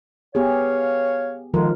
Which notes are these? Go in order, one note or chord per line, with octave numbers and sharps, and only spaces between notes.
B3 G4 G#4 C#5 F5
F2 D3 D#3 F3 G#3 A#4